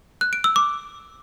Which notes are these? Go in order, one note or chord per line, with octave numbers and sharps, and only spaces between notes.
F#6
D7
E6
D6